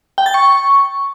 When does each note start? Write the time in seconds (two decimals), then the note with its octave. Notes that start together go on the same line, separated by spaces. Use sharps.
0.18 G5
0.26 A6
0.34 C#6